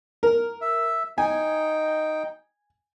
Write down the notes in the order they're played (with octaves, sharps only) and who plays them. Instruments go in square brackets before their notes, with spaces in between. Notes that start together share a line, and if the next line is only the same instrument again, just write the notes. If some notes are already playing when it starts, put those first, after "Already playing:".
[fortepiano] A#4
[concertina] E5
[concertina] D#4 G5 [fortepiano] G#5